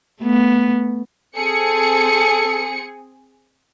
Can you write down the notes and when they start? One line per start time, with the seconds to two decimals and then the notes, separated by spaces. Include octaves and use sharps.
0.21 A3 B3
1.36 C4 G#4 A4 C#7